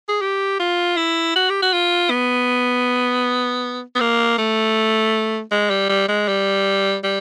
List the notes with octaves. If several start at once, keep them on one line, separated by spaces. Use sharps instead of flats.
G#4
G4
F4
E4
F#4
G4
F#4
F4
B3
B3
A#3
A3
G#3
G3
G3
G#3
G3
G3